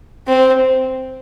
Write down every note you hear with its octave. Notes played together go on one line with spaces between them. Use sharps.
C4